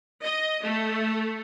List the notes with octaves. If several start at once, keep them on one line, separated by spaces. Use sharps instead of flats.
D#5
A3